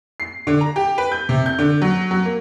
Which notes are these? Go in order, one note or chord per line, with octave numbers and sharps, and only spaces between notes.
C7
D3
A#5
G4
B4
G6
C3
G6
D3
F#3
F#3
A#3